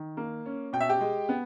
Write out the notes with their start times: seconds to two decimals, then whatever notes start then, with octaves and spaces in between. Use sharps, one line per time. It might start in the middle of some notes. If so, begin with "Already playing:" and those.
Already playing: D#3
0.17 A#3
0.46 C#4
0.73 B2 G5
0.81 E5
0.89 G4 G5
1.01 G#3
1.29 B3